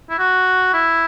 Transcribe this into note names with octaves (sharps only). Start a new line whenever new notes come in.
E4
F#4
E4